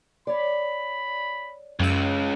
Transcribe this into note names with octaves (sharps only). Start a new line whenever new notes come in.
C#5 D5 B5
C#2 F#2 C#3 E6